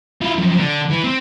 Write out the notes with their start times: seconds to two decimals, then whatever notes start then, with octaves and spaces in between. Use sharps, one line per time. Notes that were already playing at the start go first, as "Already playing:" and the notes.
0.22 E4 F4
0.36 F#2 F3
0.58 D3
0.90 E3
1.04 C4